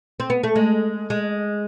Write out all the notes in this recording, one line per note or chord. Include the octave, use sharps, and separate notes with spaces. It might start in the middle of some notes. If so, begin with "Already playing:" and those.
C4
B3
A3
G#3
G#3